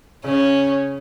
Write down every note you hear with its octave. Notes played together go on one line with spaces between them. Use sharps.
C#3 C#4